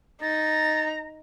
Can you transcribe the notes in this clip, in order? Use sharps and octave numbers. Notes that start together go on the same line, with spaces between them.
D#4 A#5 A6